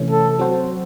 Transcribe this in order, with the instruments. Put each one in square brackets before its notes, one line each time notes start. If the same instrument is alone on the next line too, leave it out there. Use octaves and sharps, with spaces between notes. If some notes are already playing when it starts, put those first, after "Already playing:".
Already playing: [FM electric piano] C3 E3 A3 C#4
[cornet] A4
[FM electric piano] F#3 C4 F#4 C5